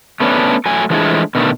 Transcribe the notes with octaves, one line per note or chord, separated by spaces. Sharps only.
A3 B3 C#4 D4
F#3 A3 G#5
E3 F3 G#3 A3 D4 G#4
B2 D3 D#3 A3